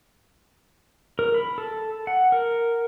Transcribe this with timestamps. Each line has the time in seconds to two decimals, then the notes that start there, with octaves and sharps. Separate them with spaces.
1.19 A#4
1.34 B5
1.58 A4
2.07 F#5
2.32 A#4